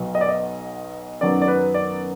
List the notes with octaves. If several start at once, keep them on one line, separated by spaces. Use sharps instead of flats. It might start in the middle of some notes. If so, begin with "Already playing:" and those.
Already playing: B1 B2 F#3 B3
D#5
D5
D#5
F#2 D#3 F#3 B3 D5
D5
B4
D5